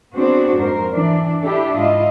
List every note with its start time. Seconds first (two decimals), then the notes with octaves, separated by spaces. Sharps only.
0.15 B3 C4 D4 F#4 G#4 C5
0.57 F2 G#2 A#4 C5
0.92 E3 D4
1.42 D4 E4 G4 A4
1.76 G#2 E4 F4 D#5